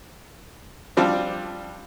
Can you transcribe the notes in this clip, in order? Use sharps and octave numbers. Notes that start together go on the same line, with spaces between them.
F3 G3 C4 D4 F4